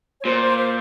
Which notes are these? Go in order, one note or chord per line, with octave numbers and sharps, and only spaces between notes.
C#5
A#2 C5
C5
C5